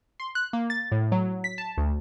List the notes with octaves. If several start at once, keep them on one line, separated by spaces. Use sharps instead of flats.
C6
F#6
A#3
A6
A2
F#3
B6
A5
D2